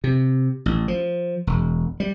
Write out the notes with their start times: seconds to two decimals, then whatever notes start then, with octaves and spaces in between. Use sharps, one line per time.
0.04 C3
0.66 A1
0.88 F3
1.47 E1
2.00 G3